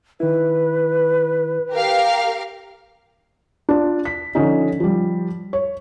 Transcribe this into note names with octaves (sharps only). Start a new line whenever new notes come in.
D#3 E4 B4
G4 A#4 F5
D4 F4
B6
D3 F3 C#4 D#4
F3 G3
C#5